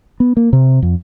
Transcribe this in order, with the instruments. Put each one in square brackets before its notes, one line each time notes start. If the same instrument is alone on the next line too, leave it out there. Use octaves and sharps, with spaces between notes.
[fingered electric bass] B3
A#3
C3
F2